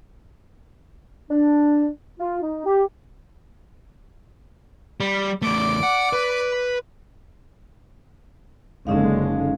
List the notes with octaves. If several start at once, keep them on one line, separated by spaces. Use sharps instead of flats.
D4
F4
D#4
G4
G3
E2 A3 D5 D6
F#5
B4
F#1 D3 G#3 C#4 D#4 F5